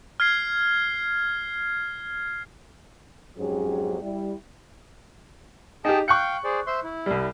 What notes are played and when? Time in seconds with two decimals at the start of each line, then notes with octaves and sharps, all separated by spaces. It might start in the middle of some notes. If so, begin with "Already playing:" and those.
0.20 F6 G#6 C7
3.38 F2 G#2 F#3 C#4 G4 G#4
4.01 G3 E4
5.85 D#4 G4 G#4 G5 A5
6.08 F5 G5 C#6 F#6 G6 C#7
6.44 G#4 C5 D5
6.67 C5 E5 C6
6.83 E4
7.06 C2 G3